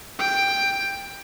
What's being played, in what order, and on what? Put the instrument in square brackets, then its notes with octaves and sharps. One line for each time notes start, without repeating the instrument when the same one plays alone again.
[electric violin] G5